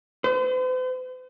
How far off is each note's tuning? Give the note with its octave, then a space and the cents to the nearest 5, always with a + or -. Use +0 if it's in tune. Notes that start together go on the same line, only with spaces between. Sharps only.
C5 -45